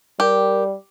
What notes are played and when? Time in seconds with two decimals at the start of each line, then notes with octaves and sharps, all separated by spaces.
0.20 G3 G4 A#4